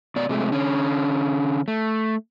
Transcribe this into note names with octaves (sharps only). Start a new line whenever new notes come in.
B2 D5
C3 G#3 A3
D3 C#4
A3